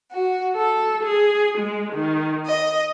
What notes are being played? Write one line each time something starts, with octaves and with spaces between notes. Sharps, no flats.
F#4
A4
G#4
G#3
D#3
D#5